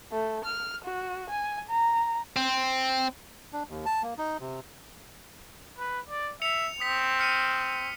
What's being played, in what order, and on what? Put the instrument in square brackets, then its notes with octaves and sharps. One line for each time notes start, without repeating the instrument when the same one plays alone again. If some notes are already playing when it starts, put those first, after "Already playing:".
[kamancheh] A3
F6
F#4
G#5
A#5
[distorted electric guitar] C4
[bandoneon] D4
D#2
A5
A#3
D#4
C3
[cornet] B4
D5
[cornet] E5 [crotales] C#7 F7
[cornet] C4 [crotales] D#6 B6 F7
[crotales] F6 C#7 D#7